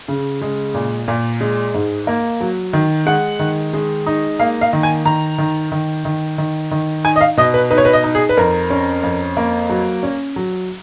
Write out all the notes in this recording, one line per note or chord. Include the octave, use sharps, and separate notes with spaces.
C#3
G#3
A#2
A#2
G#3
G#2
A#3
F#3
D#3
G#3 F#5
D#3
G#3
D#4
A#3 F5
F5
D#3
G#5
D#3 A#5
D#3
D#3
D#3
D#3
D#3
D#4 G#5
D#5
F5
B2 D#5
B4
D#4 B4
C#5
B4
D#5
D#4
G#4
B4
F2 A#4
C#4
F2
A#3
F#3
C#4
F#3